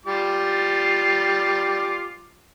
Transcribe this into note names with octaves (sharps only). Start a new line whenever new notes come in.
G3 F4 D6